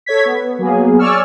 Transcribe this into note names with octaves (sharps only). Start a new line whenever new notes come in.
A4 C#5 G#6 B6
B3
F#3 A#3 B3 G#4
C#5 D5 G#5 C#6 E6 F6